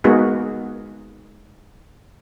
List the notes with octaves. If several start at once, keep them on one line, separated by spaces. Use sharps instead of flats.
G#3 A#3 B3 D#4 F#4 G#4